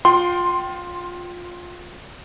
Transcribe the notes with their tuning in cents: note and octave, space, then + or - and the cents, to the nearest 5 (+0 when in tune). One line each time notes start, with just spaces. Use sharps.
F4 +15 G5 -25 C6 +0